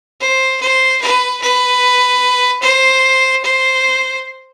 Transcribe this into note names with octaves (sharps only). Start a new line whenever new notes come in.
C5
C5
B4
B4
C5
C5